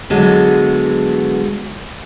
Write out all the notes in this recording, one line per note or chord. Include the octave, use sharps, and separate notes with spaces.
D3 F#3 G#3 B3